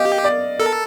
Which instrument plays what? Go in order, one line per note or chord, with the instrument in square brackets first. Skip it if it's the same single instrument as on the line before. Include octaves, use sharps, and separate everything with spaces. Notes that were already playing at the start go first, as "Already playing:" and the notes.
Already playing: [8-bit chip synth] G4 [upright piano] D#5 F5
[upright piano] D5
[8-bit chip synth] A4 [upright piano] A#4